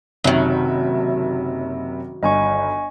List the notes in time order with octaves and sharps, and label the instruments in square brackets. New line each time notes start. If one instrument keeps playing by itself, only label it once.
[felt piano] F#1 C3 E5 [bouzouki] D#3 F#3
[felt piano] G1 [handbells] D#5 G#5 C#6